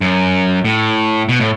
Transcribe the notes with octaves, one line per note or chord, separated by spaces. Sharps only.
F#2
A2
B2
A2